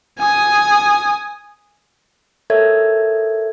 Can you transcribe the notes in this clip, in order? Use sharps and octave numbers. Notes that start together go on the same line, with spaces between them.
G#5 D#6
A4 A#4 C#5 E5 G#6